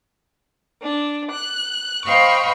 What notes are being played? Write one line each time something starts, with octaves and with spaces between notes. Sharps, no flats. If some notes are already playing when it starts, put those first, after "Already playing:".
D4
F#6
C5 D#5 F5 G5 B5 C#6